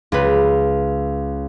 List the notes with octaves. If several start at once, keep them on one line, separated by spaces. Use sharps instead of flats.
C#2 B4